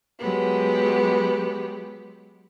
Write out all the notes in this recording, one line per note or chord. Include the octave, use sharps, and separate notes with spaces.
F#3 G#3 B3 G4